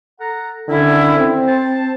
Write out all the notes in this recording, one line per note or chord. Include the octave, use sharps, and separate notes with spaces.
A4 F#5 A#5
D3 D#3 C#4 E4
C4
C5 A5